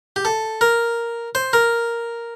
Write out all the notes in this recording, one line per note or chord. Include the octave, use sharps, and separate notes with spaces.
G4
A4
A#4
C5
A#4